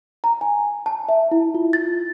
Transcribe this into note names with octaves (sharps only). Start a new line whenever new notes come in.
A#5
G#5
A5
E5
E4
F4
A6